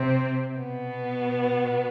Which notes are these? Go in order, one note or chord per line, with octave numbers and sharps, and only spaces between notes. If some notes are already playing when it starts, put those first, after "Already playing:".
Already playing: C3 C4
B2 B3